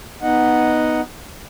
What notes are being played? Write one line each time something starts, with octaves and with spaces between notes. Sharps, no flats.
B3 D#4 D#5 F#5